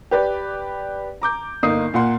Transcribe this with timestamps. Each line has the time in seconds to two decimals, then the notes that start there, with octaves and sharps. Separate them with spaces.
0.11 G4 B4 D5
1.22 A#5 D6 G6
1.63 G1 A#3 D#4 D#6 C7
1.94 A#2 A#3 F#5 C6